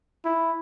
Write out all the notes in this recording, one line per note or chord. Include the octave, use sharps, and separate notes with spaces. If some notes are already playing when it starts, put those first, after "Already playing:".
E4